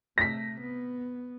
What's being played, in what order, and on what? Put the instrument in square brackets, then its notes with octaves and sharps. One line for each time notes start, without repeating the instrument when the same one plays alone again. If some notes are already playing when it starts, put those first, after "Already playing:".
[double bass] C3 A3 [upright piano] A#6 B6
[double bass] B3